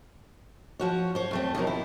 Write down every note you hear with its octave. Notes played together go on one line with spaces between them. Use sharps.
F3 F#4 C#5
C5 C#5
E2 A3 C4
D#2 B2 F3 A#4
E4